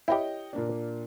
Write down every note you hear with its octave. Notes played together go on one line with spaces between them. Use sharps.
E4 G4 C#5 D#5 G5
A#2 A#3 D4